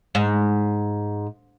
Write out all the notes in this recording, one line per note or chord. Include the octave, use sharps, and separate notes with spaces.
G#2